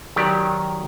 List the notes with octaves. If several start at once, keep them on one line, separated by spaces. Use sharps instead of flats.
D#3 F#3 G4 D5